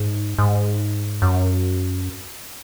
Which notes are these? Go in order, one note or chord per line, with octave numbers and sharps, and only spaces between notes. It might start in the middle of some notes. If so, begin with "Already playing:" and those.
Already playing: G#2
G#2
F#2